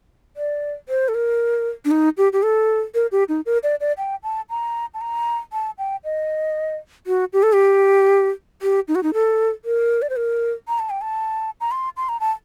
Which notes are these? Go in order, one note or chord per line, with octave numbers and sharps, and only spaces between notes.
D5
C5
A4
A#4
D4
D#4
G4
G4
A4
A#4
G4
D#4
A#4
D5
D5
G5
A5
A#5
A5
A#5
A5
G5
D#5
F#4
G4
A4
G4
G4
D#4
F#4
D#4
A4
A#4
D5
C5
A#4
A#5
A5
G5
A5
A#5
C6
C6
A#5
A5